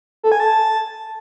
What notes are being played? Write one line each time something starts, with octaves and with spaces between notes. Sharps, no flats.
A4
G#5
A5